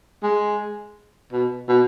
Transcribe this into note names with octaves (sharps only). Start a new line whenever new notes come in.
G#3
B2
B2